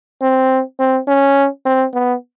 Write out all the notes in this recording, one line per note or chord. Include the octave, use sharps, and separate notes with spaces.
C4
C4
C#4
C4
B3